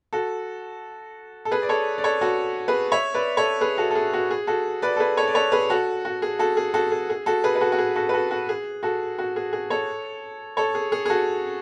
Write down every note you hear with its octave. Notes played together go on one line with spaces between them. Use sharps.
F#4 A4
A4
G#4 B4
D5
A4 C#5
D5
A4 C#5
F#4 A4
G#4 B4
C#5 E5
B4 D5
A4 C#5
G#4 B4
F#4 A4
A4
G#4
F#4
G#4
F#4 A4
B4 D5
A4
G#4 B4
A4 C#5
D5
A4 C#5
G#4 B4
F#4 A4
F#4
G#4
F#4 A4
G#4
F#4 A4
G#4
G#4
F#4 A4
G#4 B4
B4
F#4 A4
F#4
G#4
F#4 A4
B4
F#4 A4
F#4
G#4
F#4 A4
F#4
G#4
G#4
A4 C#5
A4 C#5
G#4
G#4
G#4
F#4 A4